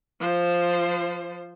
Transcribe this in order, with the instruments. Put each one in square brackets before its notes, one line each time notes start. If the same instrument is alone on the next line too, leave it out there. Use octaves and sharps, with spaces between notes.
[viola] F3 C5